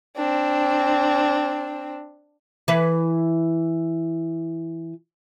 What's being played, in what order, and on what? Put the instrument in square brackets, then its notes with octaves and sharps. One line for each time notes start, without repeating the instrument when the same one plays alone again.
[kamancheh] C4 D4
[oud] E3 B4